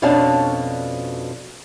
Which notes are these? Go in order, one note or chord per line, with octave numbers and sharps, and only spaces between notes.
F2 B2 C#4 D4 F5 A5